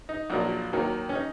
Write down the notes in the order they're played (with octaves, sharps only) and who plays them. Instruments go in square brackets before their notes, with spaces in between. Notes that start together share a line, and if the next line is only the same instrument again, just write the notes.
[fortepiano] D#4
A#1 A#2 F#3
D#2 D#3 F#3
C#4
D#4